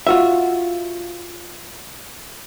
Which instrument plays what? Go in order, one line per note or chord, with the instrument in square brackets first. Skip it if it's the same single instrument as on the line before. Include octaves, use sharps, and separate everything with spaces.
[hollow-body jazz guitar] F4 F#4 E5